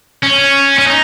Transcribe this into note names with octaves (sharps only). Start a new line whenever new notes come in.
C#4
C#4
D#4